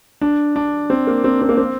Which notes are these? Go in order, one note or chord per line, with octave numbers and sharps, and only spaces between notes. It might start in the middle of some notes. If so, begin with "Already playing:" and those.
D4
D4
C4
A#3
C4
C4
A#3
C4